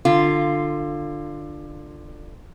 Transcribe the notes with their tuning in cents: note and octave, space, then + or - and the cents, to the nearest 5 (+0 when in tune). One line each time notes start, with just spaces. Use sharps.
D3 +20 F4 +0